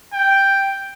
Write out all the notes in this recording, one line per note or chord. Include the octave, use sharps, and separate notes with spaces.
G5